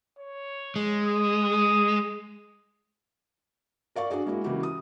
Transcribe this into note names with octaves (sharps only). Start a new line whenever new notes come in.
C#5
G#3
D#6
A#4 D5 F5 C#6
D4 F#4 G#4 D5
G#3 A#3 E4 F#4
C#3 E3 A#3 E4 F#4 G4
D#6